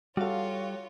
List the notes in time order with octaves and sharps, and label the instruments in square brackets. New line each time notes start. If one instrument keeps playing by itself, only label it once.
[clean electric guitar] G3 F5 [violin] F4 C#5 [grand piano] F#4 A4